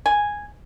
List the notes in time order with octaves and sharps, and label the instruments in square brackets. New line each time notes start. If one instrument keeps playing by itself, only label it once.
[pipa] G#5